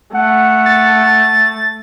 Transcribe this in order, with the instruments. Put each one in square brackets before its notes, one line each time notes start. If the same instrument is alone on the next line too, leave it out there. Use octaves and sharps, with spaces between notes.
[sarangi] A3 [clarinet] F#5
[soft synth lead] A6